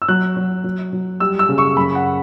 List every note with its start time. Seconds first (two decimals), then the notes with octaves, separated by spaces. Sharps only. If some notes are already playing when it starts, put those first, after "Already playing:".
0.02 E6
0.08 F#3 F#6
0.37 F#3
0.64 F#3
0.93 F#3
1.20 G3 E6
1.39 E6
1.49 C#3
1.58 C#6
1.77 F#2 B5
1.95 F#5